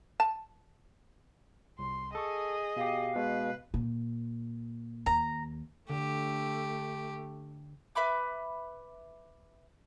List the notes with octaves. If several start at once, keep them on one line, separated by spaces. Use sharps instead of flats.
A5
C2 C6
G#4 A4 D#5 C#6
B2 G4 F5
B2 G#3 B4
A#2
D#2 A#5
D3 A3 G4
B4 E5 B5 D6